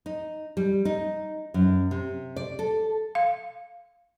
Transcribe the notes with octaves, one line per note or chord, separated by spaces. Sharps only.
D#4
G3
D#4
F#2
C3
D5
A4
F5